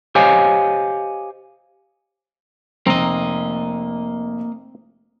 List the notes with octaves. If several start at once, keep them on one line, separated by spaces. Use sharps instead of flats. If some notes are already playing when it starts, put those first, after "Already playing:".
G4 C5 C#5 D#5 F5 G#5
F1 A#3 C4 D#5 A#5